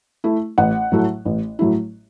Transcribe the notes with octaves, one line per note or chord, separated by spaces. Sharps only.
A3 E4
A1 F#5
A2 F#3 A3 E4
A1
A2 F#3 A3 E4